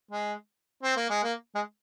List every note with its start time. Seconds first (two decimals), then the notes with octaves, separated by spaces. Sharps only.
0.11 G#3
0.83 C4
0.96 A#3
1.10 G#3
1.23 A#3
1.55 G#3